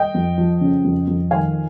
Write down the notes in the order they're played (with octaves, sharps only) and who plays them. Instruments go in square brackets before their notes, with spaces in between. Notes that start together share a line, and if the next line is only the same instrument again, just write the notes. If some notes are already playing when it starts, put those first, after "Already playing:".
Already playing: [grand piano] D#5 G5
F2
F3
C#3
F2
F2
D#3 F5 G#5